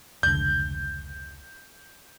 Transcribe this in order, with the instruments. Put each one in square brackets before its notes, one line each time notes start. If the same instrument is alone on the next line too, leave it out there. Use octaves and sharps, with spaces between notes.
[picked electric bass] F1 C#2 D3 [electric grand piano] G6